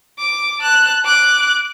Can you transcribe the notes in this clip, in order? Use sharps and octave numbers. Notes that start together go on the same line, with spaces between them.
D6
A5 F#6
D6 F#6